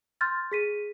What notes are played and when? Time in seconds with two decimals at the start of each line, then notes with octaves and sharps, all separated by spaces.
0.21 C6 F6 G6 A6
0.52 G#4 B6 D#7